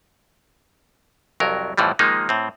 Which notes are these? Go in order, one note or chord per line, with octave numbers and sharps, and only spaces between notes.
C2 F2 F#3 A#4
F2 A2 E3 F3 G3
D#3 F3 G#3 A#3 D#4
A2 C4